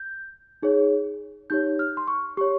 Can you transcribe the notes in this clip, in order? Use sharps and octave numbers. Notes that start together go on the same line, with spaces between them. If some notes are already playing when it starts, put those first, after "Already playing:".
Already playing: G6
D#4 G#4 C#5
D#4 G4 C#5 G6
F6
C6
C#6
G4 C#5 C#6